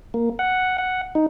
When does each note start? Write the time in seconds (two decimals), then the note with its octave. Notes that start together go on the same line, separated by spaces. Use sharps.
0.14 A#3
0.39 F#5
0.78 F#5
1.15 D#4